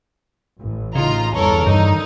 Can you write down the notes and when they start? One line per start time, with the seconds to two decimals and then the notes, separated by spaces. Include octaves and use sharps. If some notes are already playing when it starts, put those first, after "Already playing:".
0.59 A1
0.95 C#3 D#4 F4 A#5
1.34 E2 G2 A4 A#4 C#5
1.66 G2 D3 D#3 D#4